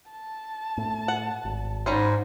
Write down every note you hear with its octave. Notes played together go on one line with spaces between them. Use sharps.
A5
A2
F#5
G#1
G#2 G3 C#4 C5